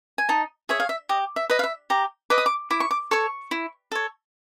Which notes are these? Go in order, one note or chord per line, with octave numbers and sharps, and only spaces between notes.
G#5
D#4 A5
G#4 C#5 E5
F5
E5
G4 D#5
E5
B4 D#5
F5
E5
G4 A#5
B4 D#5 D6
D#6
D6
E4 D6
C#6
D6
A4 C#5 C#6
E4
A4 C#5